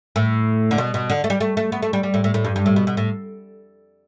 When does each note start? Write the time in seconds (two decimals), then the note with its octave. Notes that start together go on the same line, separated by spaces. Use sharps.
0.16 A2
0.71 D3
0.78 B2
0.94 B2
1.10 D3
1.24 A3
1.30 G3
1.40 A3
1.57 A3
1.72 B3
1.82 A3
1.93 G3
2.03 G3
2.14 A2
2.24 A2
2.34 A2
2.45 G2
2.56 G2
2.66 A2
2.76 B2
2.87 B2
2.97 A2